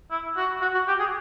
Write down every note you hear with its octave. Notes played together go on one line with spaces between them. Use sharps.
E4
F#4
F#4
F#4
G4
G#4